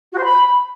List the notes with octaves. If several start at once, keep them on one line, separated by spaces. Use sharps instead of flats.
F#4
C5
B5